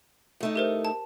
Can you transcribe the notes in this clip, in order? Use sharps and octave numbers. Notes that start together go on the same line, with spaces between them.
A2 A3 D#4
G4 A#4 C5
A5